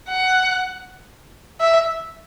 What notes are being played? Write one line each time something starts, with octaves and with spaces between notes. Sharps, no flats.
F#5
E5